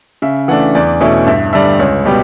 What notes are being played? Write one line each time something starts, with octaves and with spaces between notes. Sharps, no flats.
C#3 E5
E3 A3 D4 F#5
E2 D5
B2 A3 C#4 E4
G2 E5
D3 G3 D4 E5
C#2 C#5
B2 G3 B3 G4